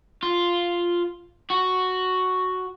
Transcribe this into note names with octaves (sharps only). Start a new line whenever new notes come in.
F4
F#4